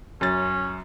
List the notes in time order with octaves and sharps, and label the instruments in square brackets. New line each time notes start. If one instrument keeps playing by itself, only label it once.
[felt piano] F#2 A6 [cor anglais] C#4